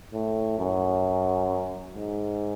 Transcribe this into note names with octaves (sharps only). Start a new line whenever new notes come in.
A2
F#2
G#2